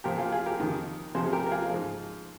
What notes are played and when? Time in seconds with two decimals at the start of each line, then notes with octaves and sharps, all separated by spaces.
0.04 A#2 F3 G4 A#4
0.18 F4 G#4
0.32 F4 G#4
0.46 G4 A#4
0.59 F2 D#3
1.15 F2 C3 F3 G#4 C5
1.25 G#4
1.33 G4 A#4
1.46 A#4
1.51 F4 G#4
1.70 G#2 F3